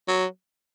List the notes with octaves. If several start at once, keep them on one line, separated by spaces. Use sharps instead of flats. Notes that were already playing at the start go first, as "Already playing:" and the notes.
F#3